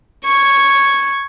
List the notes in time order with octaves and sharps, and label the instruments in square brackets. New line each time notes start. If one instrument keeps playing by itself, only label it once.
[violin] C#6 G#6